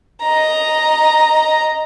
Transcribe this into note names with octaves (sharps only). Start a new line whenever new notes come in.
D#5 A#5